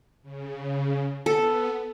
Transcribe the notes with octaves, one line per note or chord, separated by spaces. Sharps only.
C#3
B3 A4